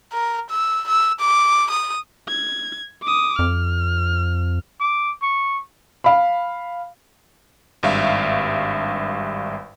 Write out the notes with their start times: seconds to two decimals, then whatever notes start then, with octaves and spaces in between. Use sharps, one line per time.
0.12 A#4
0.50 E6
0.88 E6
1.20 D6
1.70 D#6
2.29 G#6
3.02 D6 D#6
3.39 F2 F6
4.80 D6
5.22 C#6
6.04 F5 B5
7.83 G#1 G2 E5 F5